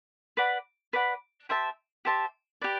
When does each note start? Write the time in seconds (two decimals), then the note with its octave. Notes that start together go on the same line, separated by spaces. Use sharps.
0.37 B4 D5 F#5 B5
0.93 B4 D5 F#5 B5
1.49 G4 C5 E5 A5
2.05 G4 C5 E5 A5
2.61 G4 B4 D5